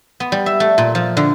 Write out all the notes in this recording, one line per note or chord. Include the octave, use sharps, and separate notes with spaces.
B3
G3
E5
A3
A#2
F3
D3